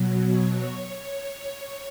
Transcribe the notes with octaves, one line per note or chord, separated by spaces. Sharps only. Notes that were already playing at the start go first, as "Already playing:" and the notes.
Already playing: B2 F#3
C#5